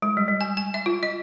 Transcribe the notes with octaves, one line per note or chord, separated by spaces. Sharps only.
G#3
G3
G3
G#5
G#5
E5
F4
D#5